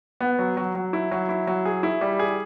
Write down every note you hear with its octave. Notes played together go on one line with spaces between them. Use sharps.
B3
F#3
F#3
F#3
E4
F#3
E4
F#3
G#4
E4
G3
G#4